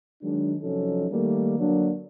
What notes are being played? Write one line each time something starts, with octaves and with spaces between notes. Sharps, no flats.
D#3 F#3 G#3 D4
C3 F3 F#3 C#4 D#4 A4
D#3 G3 A3 A#3
D3 F#3 A#3 D4